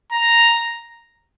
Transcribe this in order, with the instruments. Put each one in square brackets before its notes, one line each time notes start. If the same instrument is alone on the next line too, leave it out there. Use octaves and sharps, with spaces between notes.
[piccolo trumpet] A#5